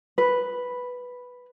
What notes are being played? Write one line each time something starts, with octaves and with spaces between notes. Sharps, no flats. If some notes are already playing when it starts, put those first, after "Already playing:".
B4